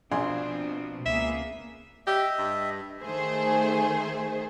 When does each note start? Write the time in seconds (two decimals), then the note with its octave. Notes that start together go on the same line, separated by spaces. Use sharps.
0.12 A#1 B2 F3 C4 D4 G#5 C6
1.06 C#2 A#3 B3 G#4 E5
2.07 G4 D#5 E5
2.39 G2
3.02 D#3 A3 G#4 C5